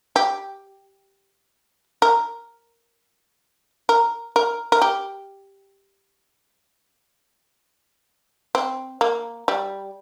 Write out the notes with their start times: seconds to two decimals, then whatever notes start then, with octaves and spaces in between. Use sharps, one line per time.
0.16 G4
2.02 A#4
3.89 A#4
4.36 A#4
4.72 A#4
4.82 G4
8.55 C4
9.01 A#3
9.48 G3